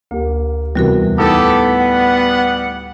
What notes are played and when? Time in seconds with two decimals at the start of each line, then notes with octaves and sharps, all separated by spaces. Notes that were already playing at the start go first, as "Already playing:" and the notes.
0.11 D2 A#3 G4
0.75 E2 C3 G3 F#4 A#4
1.18 A2 B3 D#4 G4 A4
1.78 G3 F#5